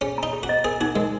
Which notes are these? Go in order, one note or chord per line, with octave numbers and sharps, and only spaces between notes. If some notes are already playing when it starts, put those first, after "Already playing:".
C#4 G#4
D#4 A#5
G#4
F#4
D#5
G#4 A#4
D#4 F#4
G#3 A#4